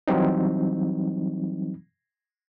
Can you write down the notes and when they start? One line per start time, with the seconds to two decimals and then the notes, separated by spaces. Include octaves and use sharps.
0.08 E3 F#3 G3 C4 D#4